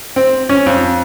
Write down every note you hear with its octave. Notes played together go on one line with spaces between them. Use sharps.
C4
C#4
F2